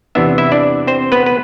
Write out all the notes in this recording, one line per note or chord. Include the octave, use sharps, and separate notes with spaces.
E2 C3 E3 B3 D4 E5
E4 E5
D4 D5
C4 C5
B3 B4
B4